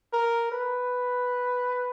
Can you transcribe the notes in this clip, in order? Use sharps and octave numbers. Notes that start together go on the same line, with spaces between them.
A#4
B4